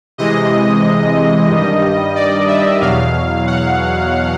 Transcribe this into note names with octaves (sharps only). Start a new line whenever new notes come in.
C3 E3 G#3 D#5
G2 D#3 G3
D5
E5
E2 B2 F#3 F5
F#5